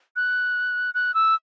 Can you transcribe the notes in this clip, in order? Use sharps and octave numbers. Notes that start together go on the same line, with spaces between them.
F#6
F#6
E6